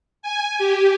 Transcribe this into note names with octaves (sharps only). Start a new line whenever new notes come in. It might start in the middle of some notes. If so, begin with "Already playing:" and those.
G#5
G4